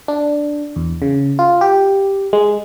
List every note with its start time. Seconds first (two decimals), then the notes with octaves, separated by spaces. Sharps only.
0.08 D4
0.76 E2
1.02 C#3
1.39 F4
1.61 G4
2.33 G#3